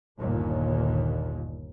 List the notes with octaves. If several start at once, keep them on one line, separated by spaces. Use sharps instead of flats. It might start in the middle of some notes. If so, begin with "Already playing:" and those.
G1 D#2 A#2